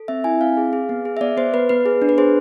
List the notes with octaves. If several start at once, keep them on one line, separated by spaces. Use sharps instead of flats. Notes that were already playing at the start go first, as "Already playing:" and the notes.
Already playing: A4
C4 E5
E4 G#5
C4 F5
G#4
G#4
B3
G#4
E5
B3 D5
B3 C5
B3 B4
B3 B4
G#4
D4
B4
G#4 C5